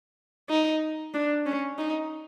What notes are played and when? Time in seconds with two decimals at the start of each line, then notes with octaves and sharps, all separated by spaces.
0.50 D#4
1.14 D4
1.46 C#4
1.79 D#4